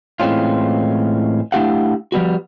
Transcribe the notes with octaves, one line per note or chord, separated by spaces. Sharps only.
A2 E3 G#3 C4 C#4 F4
A3 D4 E4 G4 F5 F#5
F3 G3 B3 F#4